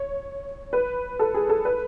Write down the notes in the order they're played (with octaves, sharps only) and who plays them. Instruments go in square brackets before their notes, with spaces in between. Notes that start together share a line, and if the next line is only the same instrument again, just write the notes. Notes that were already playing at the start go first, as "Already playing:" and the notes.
Already playing: [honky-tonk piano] C#5
B4
A4
G#4
A4
B4